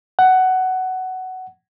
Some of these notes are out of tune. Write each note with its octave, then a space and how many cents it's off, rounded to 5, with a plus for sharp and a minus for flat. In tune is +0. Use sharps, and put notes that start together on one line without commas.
F#5 +10